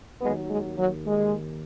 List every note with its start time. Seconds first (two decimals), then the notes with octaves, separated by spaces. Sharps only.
0.21 D#2 D#3 F#3 G#3 B3
0.50 G#3
0.78 F#3
1.07 G#3